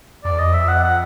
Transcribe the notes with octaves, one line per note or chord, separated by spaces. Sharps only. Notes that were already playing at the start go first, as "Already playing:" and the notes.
F2 D5
E2
F2 D#5
E5
F#5
F#5